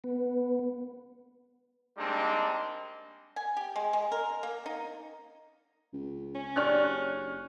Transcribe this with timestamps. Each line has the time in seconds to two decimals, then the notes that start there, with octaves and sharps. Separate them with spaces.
0.04 B3
1.98 G3 G#3 A#3 C4 D4 D#4
3.36 G#5
3.57 G4
3.76 G#3
3.93 G#3
4.12 A#4
4.43 A#3
4.66 D#4
5.93 C#2
6.35 C#4
6.56 F#1 D4 G4 D5 C#6 F6 F#6